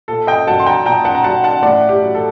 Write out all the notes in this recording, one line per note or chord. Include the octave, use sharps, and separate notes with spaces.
A#2 A4
D#5 G5
F#3 F#5 A5
C6
G5 A#5
A#2 G5 A#5
F#5 A5
A#5
F#3 F#5 A5
F#5 A5
A2 D5 F#5
G4
F#3
A4